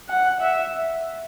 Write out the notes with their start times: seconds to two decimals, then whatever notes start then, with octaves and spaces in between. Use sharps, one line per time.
0.09 F#5
0.41 E5